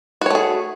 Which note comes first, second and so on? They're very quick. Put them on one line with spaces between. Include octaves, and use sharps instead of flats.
F#4 C#5 A3 G#4